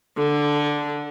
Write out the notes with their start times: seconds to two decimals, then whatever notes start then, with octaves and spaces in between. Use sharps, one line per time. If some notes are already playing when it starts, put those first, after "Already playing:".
0.17 D3